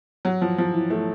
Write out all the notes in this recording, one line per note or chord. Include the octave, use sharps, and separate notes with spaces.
F#3
F3
F3
E3
A3